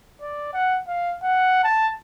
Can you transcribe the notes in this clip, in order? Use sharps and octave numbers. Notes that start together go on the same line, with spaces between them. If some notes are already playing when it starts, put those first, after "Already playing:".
D5
F#5
F5
F#5
A5